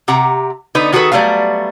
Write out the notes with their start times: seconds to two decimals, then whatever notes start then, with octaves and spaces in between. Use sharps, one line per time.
0.08 C3 G4 F#5 A#5
0.75 D3 B3 D#4 B4
0.92 D#3 F#4 G#4 A4 B4
1.12 F#3 G3 A3 B3 F5